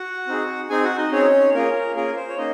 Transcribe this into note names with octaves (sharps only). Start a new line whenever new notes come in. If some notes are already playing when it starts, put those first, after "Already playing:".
Already playing: F#4 F#5
C4 D#4 G#4
C4 D#4 G#4 G#5
F#4 F#5
D#4 D#5
C4 C#4 D#4 G#4 C#5
A#3 C#4 F4 G#4 A#4
A#3 C#4 F4 G#4 A#4
C5
C#5
A#3 C#4 D#4 D#5